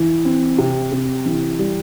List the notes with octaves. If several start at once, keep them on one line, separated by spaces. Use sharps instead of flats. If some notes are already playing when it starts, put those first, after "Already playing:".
Already playing: E3 E4
C4
C3
C3
E3
G3